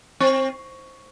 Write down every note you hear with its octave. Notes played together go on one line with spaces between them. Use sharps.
C4